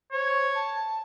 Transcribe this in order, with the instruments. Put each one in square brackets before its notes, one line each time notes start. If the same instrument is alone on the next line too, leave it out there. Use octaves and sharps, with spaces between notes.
[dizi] C5 [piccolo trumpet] C#5
[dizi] A5